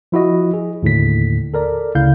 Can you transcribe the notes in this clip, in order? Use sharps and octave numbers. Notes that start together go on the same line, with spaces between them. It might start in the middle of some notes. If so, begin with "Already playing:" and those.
F3 E4 F#4 D#5
G#4
D#2 A2 D3 B6
A4 A#4 D5
D2 C#3 E4 F5 G6